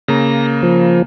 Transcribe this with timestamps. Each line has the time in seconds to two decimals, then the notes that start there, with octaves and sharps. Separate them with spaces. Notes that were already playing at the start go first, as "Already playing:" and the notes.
0.08 C#3 A#3 A#5 A#6
0.63 F3